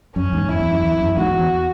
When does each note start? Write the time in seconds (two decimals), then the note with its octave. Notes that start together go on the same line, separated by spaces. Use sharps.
0.16 F#2 C#4
0.32 E2 G#2
0.49 F#2 E4
0.60 E2
0.72 F#2
0.83 E2
1.00 F#2
1.17 E2 G#2 F#4
1.28 E2
1.39 E2